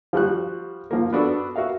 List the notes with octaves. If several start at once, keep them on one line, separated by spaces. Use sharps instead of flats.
F3 G3 F#4 F#6
F3 A#3
B3 D4 F#4 A4
F#4 A#4 E5 F5